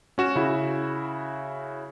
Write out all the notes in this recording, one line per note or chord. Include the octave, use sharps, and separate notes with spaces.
C#4 F#4 E7
C#3 E4 F#4